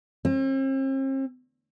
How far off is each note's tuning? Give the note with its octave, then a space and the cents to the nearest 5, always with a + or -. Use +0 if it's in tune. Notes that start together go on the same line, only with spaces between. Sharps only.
C4 +45